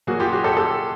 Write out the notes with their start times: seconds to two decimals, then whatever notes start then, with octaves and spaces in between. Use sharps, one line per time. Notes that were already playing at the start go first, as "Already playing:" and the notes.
0.07 A#2 F#3 A#3 F#4 G#4
0.20 F4 G4
0.33 F#4 G#4
0.44 G4 A4
0.57 G4 A4